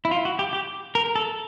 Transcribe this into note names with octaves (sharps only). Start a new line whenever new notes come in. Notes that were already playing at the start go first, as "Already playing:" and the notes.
E4
F4
F#4
G4
G4
A#4
A4